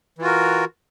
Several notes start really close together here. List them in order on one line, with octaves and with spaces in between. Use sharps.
E3 F4 F#4 A#4